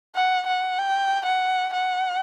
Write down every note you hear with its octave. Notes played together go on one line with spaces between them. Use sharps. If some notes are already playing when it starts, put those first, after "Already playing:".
F#5
F#5
G5
F#5
F#5